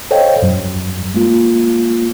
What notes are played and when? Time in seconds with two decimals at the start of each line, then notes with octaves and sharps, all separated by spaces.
0.11 A4 C5 C#5 D#5 F5 G5
0.42 F#2 F#3
1.14 G#3 A#3 F4